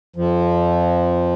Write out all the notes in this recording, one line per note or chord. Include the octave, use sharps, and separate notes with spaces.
F2 F3